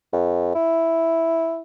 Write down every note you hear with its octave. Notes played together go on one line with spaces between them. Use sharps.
F2
E4